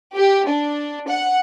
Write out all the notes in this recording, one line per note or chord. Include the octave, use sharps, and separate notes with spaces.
G4
D4
F#5